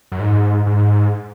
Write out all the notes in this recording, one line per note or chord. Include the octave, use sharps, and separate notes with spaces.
F#2
G#2
G#2